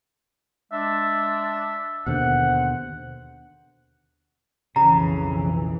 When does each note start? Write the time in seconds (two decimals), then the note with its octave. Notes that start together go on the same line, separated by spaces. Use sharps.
0.72 G#3 D4 E5
2.06 D#2 B2 D3 C5 F#5
4.76 B1 F2 C#3 E3 A#5